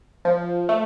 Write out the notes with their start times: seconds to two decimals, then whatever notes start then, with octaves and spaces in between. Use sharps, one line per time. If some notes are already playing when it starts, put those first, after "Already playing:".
0.25 F3
0.69 A3